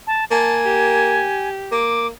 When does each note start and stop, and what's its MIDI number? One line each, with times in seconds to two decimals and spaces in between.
0.07 0.25 81
0.31 1.29 58
0.31 1.49 80
0.31 0.58 81
0.65 1.81 67
1.72 2.10 58
1.72 2.07 86